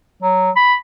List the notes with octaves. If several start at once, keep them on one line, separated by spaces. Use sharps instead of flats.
F#3
B5